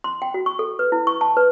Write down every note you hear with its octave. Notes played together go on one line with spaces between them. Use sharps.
C6
G5
F#4
C#6
A4
B4
E4
C#6
A5
B4